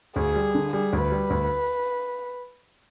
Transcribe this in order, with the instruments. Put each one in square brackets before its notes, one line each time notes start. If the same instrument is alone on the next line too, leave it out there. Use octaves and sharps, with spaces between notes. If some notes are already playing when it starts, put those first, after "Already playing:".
[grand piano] D2 [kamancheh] G#4
[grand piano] G3
D3
[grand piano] G3 [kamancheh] G#4
[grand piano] D2
[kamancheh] B4
[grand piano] G3
D2